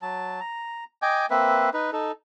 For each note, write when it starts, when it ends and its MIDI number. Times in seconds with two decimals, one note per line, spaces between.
0.02 0.40 54
0.02 0.40 81
0.40 0.84 82
1.02 1.26 75
1.02 1.26 79
1.02 1.26 80
1.02 1.26 86
1.30 1.70 58
1.30 1.70 60
1.30 1.70 71
1.30 1.70 76
1.73 1.91 63
1.73 1.91 71
1.92 2.12 63
1.92 2.12 69